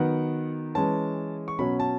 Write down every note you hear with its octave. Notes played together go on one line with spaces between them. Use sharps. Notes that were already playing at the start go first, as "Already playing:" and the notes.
Already playing: D#3 F#3 B3 F#5
E3 G#3 C#4 A5
C#6
B2 F#3 C#4 B5
A5